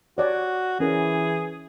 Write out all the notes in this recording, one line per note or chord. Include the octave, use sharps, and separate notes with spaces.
F#4 C#5 D5 F#5
E3 C#4 G#4 A#4